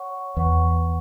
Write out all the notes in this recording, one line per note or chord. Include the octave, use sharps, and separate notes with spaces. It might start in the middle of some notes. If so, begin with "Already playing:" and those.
Already playing: C#5 F#5 C#6
E2 B4 F#5 C#6